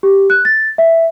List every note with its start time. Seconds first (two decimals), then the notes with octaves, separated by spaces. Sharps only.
0.03 G4
0.30 F#6
0.45 A6
0.78 E5